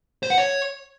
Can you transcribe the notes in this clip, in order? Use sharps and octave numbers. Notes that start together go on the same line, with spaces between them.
C5
F#5
C#5